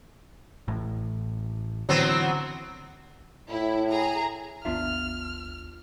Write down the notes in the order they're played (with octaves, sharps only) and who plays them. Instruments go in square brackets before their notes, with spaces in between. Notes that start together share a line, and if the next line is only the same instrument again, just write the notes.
[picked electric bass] A1 A2
[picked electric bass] D3 E3 [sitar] F#3 B3 C4
[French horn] A2 [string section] E4
[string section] G#4 A#5
[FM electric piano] G#1 D#2 B3 [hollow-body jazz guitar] D4 F4 E5 [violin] F6